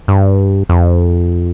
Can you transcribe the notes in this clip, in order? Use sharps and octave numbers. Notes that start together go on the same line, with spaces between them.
G2
F2